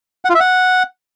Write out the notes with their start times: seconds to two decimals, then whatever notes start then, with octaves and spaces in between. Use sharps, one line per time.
0.25 F#5
0.30 F4
0.35 E5
0.40 F#5